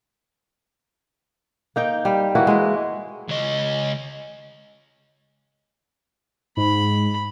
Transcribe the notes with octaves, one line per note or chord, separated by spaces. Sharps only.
A#3 D#4 G5
G3
E3 A#3 E4 F#4
G#3 E4
C#2 D#5
G#2 B5